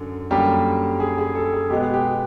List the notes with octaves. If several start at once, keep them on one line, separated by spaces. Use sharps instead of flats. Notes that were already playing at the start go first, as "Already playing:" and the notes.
Already playing: F#2 D3
F#2 D3 G3 A#3 G4
G#4
G#4
A4
G#4
B2 G#3 B3 G4
G4